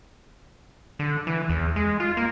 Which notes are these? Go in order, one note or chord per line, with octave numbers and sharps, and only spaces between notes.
D3
E3
E2
G#3
F4
A#3